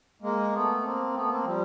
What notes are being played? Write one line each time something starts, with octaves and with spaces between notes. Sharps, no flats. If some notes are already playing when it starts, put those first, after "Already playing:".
G#3 A#3
A3 B3
A#3 C4
A3 B3
A#3 C4
F3 G3